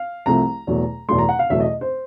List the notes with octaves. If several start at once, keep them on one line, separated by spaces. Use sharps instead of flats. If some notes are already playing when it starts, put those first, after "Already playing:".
Already playing: F5
C2 C3 F3 A3 A#5
E2 B2 F#3 A3
E2 B2 F#3 A3 C6
A#5
F#5
F5
E2 B2 F#3 A3 E5
D#5
C5